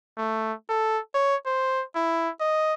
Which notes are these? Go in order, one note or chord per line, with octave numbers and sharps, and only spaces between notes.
A3
A4
C#5
C5
E4
D#5